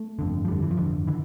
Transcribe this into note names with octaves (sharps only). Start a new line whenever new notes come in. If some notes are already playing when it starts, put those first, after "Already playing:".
Already playing: A3
G1 F2 D3
F3
G1 F2 D3 G3
E3
F3
G1 F2 D3 E3
D3 E3